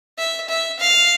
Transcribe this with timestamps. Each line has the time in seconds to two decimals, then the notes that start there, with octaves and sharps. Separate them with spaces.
0.18 E5
0.49 E5
0.80 F5